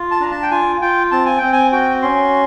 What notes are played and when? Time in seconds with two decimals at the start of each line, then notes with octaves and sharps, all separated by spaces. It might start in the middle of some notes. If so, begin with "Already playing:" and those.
Already playing: F4
0.11 A5
0.20 D4 A#5
0.31 A5
0.43 G5
0.51 F4 G#5
0.81 F4 G5
1.11 C4 A5
1.26 G#5
1.38 C4 G5
1.53 G#5
1.72 F#4 G5
2.02 C#4 C6